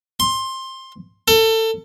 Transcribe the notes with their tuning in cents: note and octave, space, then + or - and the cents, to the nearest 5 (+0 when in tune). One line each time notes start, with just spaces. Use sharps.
C6 +15
A4 +25